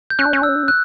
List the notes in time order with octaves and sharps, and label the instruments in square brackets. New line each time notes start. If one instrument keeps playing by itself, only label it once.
[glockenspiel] G6
[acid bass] C#4 [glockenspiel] F#6
[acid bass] D4
C#4
[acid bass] D4 [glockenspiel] E6
[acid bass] C#4
D4
C#4
[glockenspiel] F#6